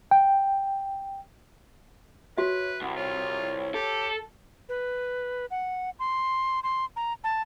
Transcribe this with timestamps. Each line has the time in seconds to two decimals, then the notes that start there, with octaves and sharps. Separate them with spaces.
0.11 G5
2.38 F#4 B4 C#5 E5
2.82 C2 F#5
2.96 F4 C#5
3.74 G4 A4
4.69 B4
5.51 F#5
5.99 C6
6.63 C6
6.96 A#5
7.24 A5